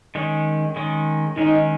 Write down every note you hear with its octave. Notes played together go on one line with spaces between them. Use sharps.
D#3 G#3 C#4
D#3 G#3 C#4
D#3 G#3 C#4 D#4